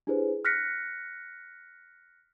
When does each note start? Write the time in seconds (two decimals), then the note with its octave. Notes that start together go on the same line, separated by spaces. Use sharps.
0.07 D4 E4 G4 G#4 B4 C5
0.45 F6 F#6 A#6 B6 C#7